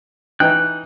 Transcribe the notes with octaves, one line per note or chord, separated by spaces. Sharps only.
E3 D#4 G5 F#6